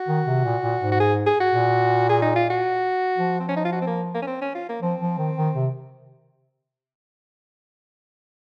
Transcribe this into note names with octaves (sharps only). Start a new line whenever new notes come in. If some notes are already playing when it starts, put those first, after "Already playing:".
Already playing: F#4
D#3
C3
A#2
A#2
G#2
F#4
G#4
G#4
F#4
A#2
G#4
D#4
F4
F#4
F3
C4
C#4
D#4
F4
F#4
C4
A#3
A#3
C#4
C4
C#4
F4
A#3
F3 C4
F3
D#3
D#3
C3